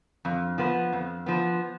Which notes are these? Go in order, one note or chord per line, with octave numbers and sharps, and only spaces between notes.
F2
F3 B3
F2
F3 B3